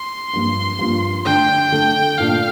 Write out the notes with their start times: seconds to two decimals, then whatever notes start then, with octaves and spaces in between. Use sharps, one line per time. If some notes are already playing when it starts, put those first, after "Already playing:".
Already playing: C6
0.33 G2 F3 A#3 F4
0.79 G2 F3 A#3 F4
1.25 D3 A3 D4 A4 G5
1.72 D3 A3 D4 A4
2.18 A#2 A3 D4 F4 F5